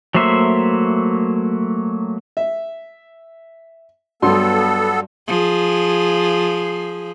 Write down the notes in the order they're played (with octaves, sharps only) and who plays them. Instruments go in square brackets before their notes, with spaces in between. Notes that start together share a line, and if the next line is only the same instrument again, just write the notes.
[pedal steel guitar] F#3 A3 A#3 C5 E5
[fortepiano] E5
[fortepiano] G2 F#3 C6 [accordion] B3 A4
[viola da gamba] F3 G#4